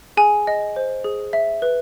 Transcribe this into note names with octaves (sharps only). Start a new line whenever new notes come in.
G#4 G#5
D#5
C5
G#4
E5
B4